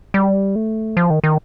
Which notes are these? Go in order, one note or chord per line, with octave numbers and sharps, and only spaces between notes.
G3
A3
F3
D#3
D#3